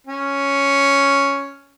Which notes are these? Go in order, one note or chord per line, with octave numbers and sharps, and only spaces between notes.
C#4